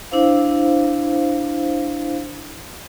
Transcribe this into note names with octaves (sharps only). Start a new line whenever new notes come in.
D4 E4 C5 F5